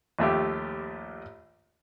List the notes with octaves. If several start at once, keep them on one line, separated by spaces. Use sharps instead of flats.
A#1 D#2 A3 G4